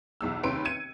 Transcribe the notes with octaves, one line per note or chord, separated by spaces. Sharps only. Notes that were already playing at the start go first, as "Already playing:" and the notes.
B1 E2 E6
D#2 C3 C#4 B4 C6 D7
G#6 C#7 D#7